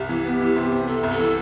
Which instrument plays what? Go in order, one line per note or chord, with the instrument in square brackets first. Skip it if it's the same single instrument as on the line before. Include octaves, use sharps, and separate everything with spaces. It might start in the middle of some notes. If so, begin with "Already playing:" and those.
Already playing: [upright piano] C2 [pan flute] G4
[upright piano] E3
B3
E3
C3
C3
[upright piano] C3 [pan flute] A4
[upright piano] C2
[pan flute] A4
[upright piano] E3